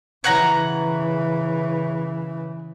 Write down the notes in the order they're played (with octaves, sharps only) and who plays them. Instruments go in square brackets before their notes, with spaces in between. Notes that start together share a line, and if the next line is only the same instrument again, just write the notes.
[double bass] C#3 E3 [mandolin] C#5 F#5 A#5